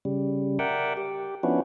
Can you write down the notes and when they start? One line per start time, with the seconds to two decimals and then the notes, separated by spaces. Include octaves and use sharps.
0.05 C#3 G3
0.59 A#4 D5 E5 F#5 G5
0.97 G4
1.43 F3 B3 C#4 D4 E4 F#4